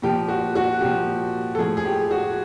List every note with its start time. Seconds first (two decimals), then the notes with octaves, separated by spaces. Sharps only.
0.02 A#2 F3 G4
0.28 F#4
0.55 F#4
0.81 A#2 F3 G4
1.55 A4
1.58 A2 F3 G#4
1.77 G#4
1.85 G4
2.11 F#4